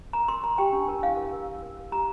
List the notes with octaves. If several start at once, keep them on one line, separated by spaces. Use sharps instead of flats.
A#4 A#5
A#4 C6
A#4 A#5
G4 G5
D4
A#4
E4 F5
A#4
A#4
A#4
A#4
A#4
G4 A#5